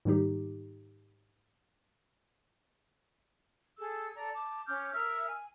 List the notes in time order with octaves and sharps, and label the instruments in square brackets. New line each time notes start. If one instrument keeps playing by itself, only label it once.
[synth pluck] G#2 D#3 G3 D#4 G4
[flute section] G#4 A4 E6
A4 D5 A#5
A5 D6
C#4 D6 F6 G6
A#4 E5 E6 F6
G#5